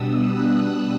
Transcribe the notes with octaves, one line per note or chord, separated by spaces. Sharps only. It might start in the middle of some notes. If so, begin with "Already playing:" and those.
Already playing: B2 G3 B3 D4 D#6 E6
F#6